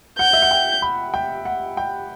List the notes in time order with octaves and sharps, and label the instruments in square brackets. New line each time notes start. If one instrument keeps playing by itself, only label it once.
[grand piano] F#5 [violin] G6
[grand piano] E5
F#5
G5
B5
G5
F#5
G5